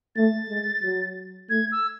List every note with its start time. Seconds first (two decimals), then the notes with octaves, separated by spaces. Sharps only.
0.16 A3 A6
0.49 G#3
0.83 F#3
1.49 A3 G#6
1.72 E6